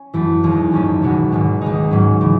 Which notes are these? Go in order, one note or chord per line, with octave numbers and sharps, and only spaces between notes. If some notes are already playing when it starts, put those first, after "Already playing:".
Already playing: C#4
F#2 E3 A3 E4
E1 D#2 D#3 G#3
G#1 F#2 D#3 A3 C#4
C#2 B2 G#3 B3 F#4
G#1 G#2 D#3
C#2 C#3 G#3 D#4
G#2 F#3 C#4
C#3 E3